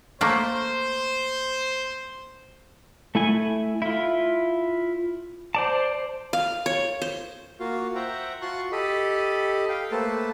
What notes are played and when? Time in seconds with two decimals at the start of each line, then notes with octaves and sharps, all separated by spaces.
0.21 A3 A#3 C5
3.15 A3 E4 G#5
3.82 E4 F4
5.55 C5 D5 A5
6.33 F5
6.66 C#5
7.02 C5
7.60 A#3 F4 F#4 F5
7.95 C5 E5 F#5 G5 A#5
8.42 F4 F#4 A5 C6 C#6 F#6
8.72 G4 A4 D#5 B5
9.69 F5 G5
9.91 A3 A#3 A4 B4 C5 A5